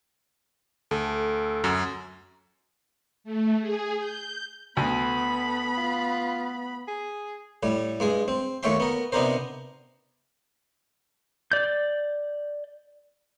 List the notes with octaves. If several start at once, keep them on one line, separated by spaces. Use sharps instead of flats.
D2 A4
F#2 F#3
A3
G#4
G6
D2 B3 A4 B5
F4
G#4
A2 G3
G2 G#3 G#4
C4
D#2 A3 C#5 E5 G5 C6
B3 A#4
C3 B3 D4 D#4 A#4 C5
D5 G6